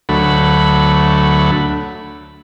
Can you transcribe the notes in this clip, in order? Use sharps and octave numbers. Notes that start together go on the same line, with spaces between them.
D2 F#3 A3 B5